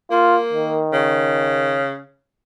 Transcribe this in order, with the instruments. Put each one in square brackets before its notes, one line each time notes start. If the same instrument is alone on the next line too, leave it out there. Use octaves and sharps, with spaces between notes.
[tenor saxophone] A#3 [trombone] F4
[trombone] D#3
[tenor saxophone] C#3